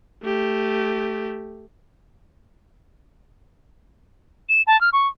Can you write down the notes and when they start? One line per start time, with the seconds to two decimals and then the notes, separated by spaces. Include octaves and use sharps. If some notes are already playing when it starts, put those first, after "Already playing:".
0.24 A3 G4
4.49 E7
4.67 A5
4.81 F6
4.93 C#6